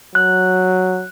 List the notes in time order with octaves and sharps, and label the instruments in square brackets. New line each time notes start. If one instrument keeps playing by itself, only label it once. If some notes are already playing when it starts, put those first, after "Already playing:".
[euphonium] F#3 [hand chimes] F#6